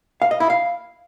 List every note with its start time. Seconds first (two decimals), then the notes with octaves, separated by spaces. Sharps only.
0.22 F5
0.31 D#5
0.40 E4
0.50 F5